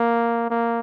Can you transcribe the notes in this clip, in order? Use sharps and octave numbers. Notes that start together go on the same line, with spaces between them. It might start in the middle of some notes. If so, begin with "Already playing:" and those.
Already playing: A#3
A#3